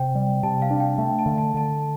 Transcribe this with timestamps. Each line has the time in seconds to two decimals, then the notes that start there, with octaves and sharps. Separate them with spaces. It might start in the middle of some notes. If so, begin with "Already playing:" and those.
Already playing: C3 G5
0.15 G3
0.43 C3 A5
0.62 F5
0.71 D4
0.80 G5
0.98 A3 A5
1.19 A5
1.26 D3
1.38 A5
1.54 D3 A5